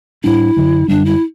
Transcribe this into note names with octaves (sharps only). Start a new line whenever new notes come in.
A2 G3 D4 E4
F#2 D3 F#3
F#2 D3 G3 D4
E4